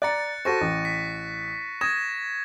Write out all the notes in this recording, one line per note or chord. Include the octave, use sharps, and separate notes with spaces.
D5 A#5 F#6 A6 C#7
F#4 A4 C5 C#6 A#6 D#7
A1
B6
D#6 G#6 A#6 E7